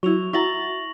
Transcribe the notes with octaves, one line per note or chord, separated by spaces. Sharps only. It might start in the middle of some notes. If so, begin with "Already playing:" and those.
F#3 E4 F#4 C#6 F7
E4 F#4 E5 A#5 C#6 A6 A#6 F#7